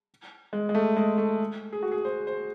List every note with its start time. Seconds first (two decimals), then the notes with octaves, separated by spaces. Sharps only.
0.53 G#3
0.69 G#3
0.75 A3
0.97 G#3
1.18 A3
1.73 G#4
1.83 F#4
1.92 G#4
2.05 C5
2.27 C5